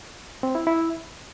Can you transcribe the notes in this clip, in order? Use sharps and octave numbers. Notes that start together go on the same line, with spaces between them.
C4
E4
E4